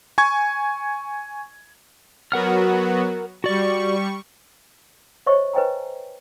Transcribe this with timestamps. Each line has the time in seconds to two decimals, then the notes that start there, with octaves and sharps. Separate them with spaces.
0.18 G#5 C#6 G#6
2.32 F#3 B3 F#4 A#4 F#5 F6
3.44 G3 F#4 D5 C#6
5.26 C5 C#5 D#5 E5 C#6
5.54 B4 C5 D#5 G5 G#5 A#5